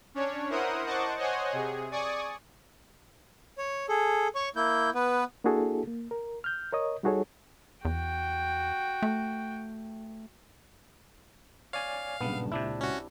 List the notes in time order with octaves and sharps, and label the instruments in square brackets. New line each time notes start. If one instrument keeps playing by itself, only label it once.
[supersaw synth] C#4 D4 C#5
E4 A#4 C5 F#5 D#6
C5 D#5 F#5 A5 C#6 D6
C5 C#5 D#5 F#5 G#5
C3 G#4
D5 G#5 C#6 D#6
[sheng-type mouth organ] C#5
G#4 A4
C#5 C#6
A#3 E4 G6
B3 B4
[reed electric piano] A#3 D4 E4 F#4 G#4 A4
A#3
A#4
F6 G6
A#4 C#5 D#5 D#6
G3 D#4 F#4 G#4 A4 C#5
[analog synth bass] E2 [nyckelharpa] F#4 G5
[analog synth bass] A3
[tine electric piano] C#5 D5 G#5 [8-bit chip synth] F5
[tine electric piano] B1 G2 C#3 [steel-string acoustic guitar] A#2 A5 [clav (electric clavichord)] B3
[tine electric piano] C#2 [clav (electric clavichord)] C3 D4 E4
[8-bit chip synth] C#4 F#4